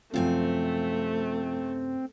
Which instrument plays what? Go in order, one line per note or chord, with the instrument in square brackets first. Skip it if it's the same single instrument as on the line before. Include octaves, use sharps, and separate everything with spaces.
[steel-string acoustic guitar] F#2 C3 G#5 [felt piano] F3 F4 [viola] A3 [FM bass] C4